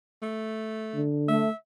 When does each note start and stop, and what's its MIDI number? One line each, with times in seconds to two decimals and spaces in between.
0.22 1.04 57
0.95 1.42 50
1.28 1.49 57
1.28 1.55 76